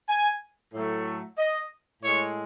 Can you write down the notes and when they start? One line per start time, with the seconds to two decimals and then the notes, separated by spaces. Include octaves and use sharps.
0.09 G#5
0.73 A2 F#3 A3
1.38 D#5
2.02 A2 G#3 C#5